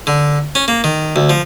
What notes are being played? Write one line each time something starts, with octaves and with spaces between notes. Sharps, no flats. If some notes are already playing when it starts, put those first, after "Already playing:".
D3
C#4
A#3
D#3
D2
F3